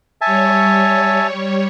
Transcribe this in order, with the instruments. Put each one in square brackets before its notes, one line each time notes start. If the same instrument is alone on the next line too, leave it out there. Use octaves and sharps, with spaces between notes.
[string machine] G3 C#5 [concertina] E5 G#5 A5